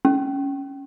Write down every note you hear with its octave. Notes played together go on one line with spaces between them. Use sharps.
C#4